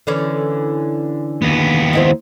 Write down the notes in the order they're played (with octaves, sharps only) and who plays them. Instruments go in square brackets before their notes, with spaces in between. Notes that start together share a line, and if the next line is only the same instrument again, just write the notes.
[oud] D3 E3 C#4
[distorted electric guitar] D#2 B3
[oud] D#4 E4 C5